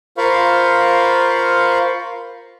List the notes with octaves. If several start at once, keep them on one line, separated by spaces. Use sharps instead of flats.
F4 A#4 C5 F5 B5 C#6